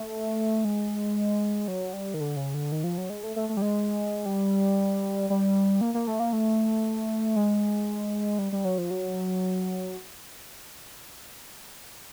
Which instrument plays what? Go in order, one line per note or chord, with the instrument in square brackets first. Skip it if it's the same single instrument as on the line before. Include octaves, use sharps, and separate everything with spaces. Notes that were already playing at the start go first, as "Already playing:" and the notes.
Already playing: [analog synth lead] A3
G#3
F#3
G3
D#3
D3
C#3
D3
D#3
F3
F#3
G#3
A3
A3
A3
G3
G#3
G3
G3
A#3
A#3
A3
A#3
A3
G#3
G3
G3
F#3
F3
F#3